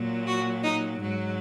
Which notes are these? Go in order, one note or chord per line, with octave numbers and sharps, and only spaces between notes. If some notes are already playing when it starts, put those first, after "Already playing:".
Already playing: A#2 F#3
F#4
D#4
G#2 F#3